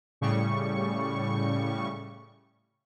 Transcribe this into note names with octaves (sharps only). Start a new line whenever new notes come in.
A2 C#3 G3 C#6